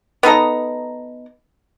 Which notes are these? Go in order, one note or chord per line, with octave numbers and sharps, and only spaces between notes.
B3 D#4 A4 A#5